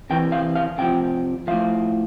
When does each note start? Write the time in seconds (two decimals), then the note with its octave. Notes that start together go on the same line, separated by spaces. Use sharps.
0.10 C3 E3 G5
0.32 F5
0.55 F5
0.78 C3 F3 G5
1.47 A2 F3 F5